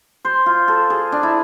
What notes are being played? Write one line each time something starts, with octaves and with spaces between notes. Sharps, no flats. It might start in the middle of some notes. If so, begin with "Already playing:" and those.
C5
F4
A4
G#4
D4
E4